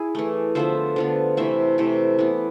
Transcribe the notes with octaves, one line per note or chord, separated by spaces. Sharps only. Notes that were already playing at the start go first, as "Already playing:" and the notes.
Already playing: E4 G#4
E3 A3
D3 F3 B3 C5 E5
D3 F3 B3
C3 E3 A3 C5 E5
C3 E3 A3
E3 B3